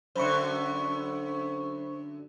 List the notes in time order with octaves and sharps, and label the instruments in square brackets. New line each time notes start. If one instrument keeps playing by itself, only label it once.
[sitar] F#2 D3 [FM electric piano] C5 B5 C#6